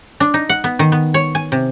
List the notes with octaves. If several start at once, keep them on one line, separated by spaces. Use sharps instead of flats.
D4
D#4
F#5
B3
D#3
B3
C#5
G#5
C3